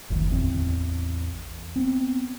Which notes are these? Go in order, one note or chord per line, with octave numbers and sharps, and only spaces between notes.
F#1 D2 D#3
A1 E2 C4
B3 C4